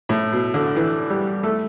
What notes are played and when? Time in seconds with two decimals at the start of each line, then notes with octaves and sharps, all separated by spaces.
0.09 A2
0.32 B2
0.54 D3
0.76 E3
1.10 G3
1.43 A3